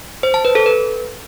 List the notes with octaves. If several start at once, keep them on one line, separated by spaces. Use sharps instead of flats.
C5
A5
B4
A4
B4